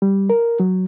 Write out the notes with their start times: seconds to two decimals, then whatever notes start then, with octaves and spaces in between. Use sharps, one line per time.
0.02 G3
0.30 A#4
0.60 F#3